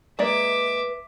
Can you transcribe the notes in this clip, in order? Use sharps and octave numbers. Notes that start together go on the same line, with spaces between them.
G#3 A#3 B4 D5 E5 D6